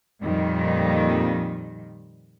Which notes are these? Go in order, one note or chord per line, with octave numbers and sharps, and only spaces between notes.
F2 A#2 D#3 G3